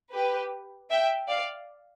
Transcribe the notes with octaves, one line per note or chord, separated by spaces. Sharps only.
G4 B4
E5 G5
D5 F5